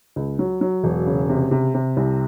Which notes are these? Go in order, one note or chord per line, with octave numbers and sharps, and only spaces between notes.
C#2
F#3
F#3
E1
C#3
C3
C3
C3
C2